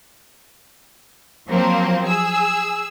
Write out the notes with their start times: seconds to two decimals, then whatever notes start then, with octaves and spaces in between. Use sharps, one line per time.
1.47 F3 F#3 A#3 C4
2.07 G#4 E6